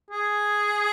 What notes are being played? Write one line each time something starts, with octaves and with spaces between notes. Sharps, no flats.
G#4